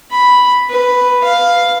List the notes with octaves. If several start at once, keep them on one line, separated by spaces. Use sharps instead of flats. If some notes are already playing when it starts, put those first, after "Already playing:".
B5
B4
F5